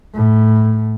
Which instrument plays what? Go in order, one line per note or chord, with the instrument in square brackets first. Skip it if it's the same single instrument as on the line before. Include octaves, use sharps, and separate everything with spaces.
[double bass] A2